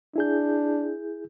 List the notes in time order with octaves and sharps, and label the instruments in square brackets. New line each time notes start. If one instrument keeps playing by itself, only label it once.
[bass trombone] D4 [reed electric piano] E4 G#4 G6